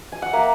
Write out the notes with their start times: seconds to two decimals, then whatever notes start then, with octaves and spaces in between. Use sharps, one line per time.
0.12 G#5
0.22 F#5
0.33 A#3 E5